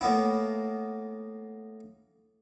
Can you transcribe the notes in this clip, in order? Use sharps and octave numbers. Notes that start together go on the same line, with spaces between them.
A2 A#3 B3 E4